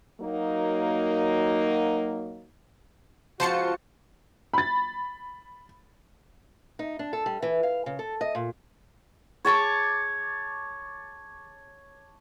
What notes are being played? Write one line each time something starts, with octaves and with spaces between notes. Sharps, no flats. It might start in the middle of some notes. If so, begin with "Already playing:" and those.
F#3 A#3 D#4
C#2 F3 F4 F#4 C5 A5 C#7
B5 A6
D#4
D4
A4
G3
E3
F5
C#3
A4
D#5
A#2
C#5 A5 C#6 D6